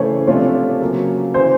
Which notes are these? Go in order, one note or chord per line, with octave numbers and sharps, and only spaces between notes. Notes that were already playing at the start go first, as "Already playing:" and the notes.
Already playing: C#3 E3 A3 C5 C#5
C3 F3 A3 D4 F4 C#5
C#3 F#3 A#3
C#3 E3 C5